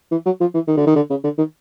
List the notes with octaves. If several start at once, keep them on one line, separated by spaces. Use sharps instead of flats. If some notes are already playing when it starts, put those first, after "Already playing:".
E3
F#3
F3
E3
D#3
D3
D#3
D3
C#3
D3
D#3